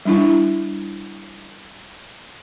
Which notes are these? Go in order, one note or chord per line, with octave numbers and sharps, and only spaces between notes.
G3 D4 E4